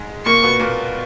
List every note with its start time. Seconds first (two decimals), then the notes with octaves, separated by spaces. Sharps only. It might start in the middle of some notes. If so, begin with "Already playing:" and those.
Already playing: G#2 G#3
0.26 A#2 A#3 C#6
0.43 B2 B3
0.60 A#2 A#3